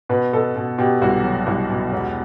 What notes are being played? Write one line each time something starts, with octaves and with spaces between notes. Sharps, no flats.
B2 B4
B2 A4
B2
B2 G4
C2 F#4
F#3
C2
B2
E1